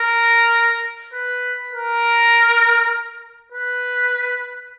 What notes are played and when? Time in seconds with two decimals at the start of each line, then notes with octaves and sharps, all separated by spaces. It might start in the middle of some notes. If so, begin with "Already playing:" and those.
Already playing: A#4
1.13 B4
1.73 A#4
3.52 B4